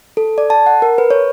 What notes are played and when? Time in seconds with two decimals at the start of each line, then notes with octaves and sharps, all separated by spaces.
0.17 A4
0.38 D5
0.50 A5
0.66 F#5
0.82 A#4
0.98 B4
1.10 C#5